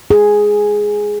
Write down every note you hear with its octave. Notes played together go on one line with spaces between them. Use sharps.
G#4